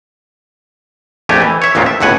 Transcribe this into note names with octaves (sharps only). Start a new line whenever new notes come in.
A#1 F2 A3 G4 G#5
E3
C#5 E5
A1 D#2 A#2 G#3 C4 F4
E5
G1 C#2 A2 F#5 G#5